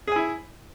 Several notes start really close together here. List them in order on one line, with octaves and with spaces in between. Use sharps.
G#4 G#5 E4